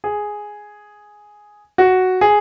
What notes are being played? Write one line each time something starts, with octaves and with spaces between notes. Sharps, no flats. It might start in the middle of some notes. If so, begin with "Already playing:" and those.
G#4
F#4
G#4